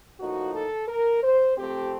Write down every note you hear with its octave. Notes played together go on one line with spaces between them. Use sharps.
A2 F3 A#3 D#4 F#4
A4
A#4
C5
C3 F3 A3 C4 G4